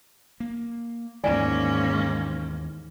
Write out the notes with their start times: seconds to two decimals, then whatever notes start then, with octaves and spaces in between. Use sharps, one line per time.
0.40 A#3
1.24 D#2 G#2 D#3 E3 A#3 C#4 D5 G#5